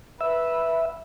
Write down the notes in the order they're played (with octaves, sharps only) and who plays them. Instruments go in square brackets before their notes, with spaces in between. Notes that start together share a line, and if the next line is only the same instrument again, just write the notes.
[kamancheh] B4 [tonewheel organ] E5